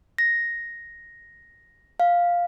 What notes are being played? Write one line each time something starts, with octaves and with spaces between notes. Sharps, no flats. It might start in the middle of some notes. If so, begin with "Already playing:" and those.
A#6
F5